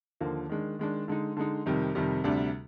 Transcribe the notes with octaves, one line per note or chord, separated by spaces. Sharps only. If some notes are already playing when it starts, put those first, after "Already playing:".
D#2 D3 F3 A#3
D#3 G#3 D4
D#3 G#3 D4
D3 G#3 D#4
D3 G#3 D#4
F2 C3 D#3 G3
F2 C3 D#3 G3
D2 C3 G3 D4